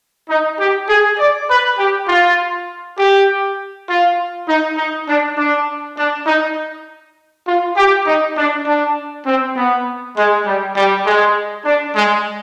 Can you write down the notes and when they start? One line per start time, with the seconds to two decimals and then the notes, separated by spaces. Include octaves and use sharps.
0.29 D#4
0.59 G4
0.89 G#4
1.18 D5
1.48 B4
1.78 G4
2.08 F4
2.97 G4
3.88 F4
4.47 D#4
4.77 D#4
5.08 D4
5.37 D4
5.97 D4
6.27 D#4
7.46 F4
7.76 G4
8.06 D#4
8.36 D4
8.66 D4
9.26 C4
9.55 B3
10.16 G#3
10.45 G3
10.76 G3
11.05 G#3
11.65 D4
11.95 G#3